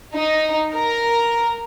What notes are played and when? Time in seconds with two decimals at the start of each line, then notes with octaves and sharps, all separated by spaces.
0.14 D#4
0.74 A#4